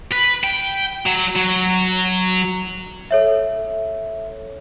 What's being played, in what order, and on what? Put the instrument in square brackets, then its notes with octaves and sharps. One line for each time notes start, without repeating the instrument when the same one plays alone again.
[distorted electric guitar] B4
G5
F#3
F#3
[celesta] A4 C#5 E5